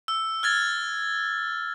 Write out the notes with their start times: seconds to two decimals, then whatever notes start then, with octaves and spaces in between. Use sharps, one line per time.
0.08 E6
0.43 F6 G#6 A6